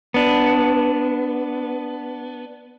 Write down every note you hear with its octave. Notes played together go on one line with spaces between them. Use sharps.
B3 D4